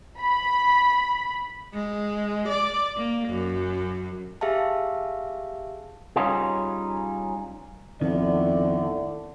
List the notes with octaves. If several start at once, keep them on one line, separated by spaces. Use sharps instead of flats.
B5
G#3
D5
A#3
F#2
G4 G#4 E5 F5 A5
G3 C#4 D#4 F4 G#4
F2 A2 D3 D#3 A3 B3 D5